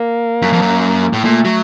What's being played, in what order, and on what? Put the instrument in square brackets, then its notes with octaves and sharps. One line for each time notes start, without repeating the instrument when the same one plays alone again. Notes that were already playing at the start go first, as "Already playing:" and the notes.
Already playing: [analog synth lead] A#3
[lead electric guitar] F#2
F2
F#2
A2
[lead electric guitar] A#2 [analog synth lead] A3
[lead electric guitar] F#3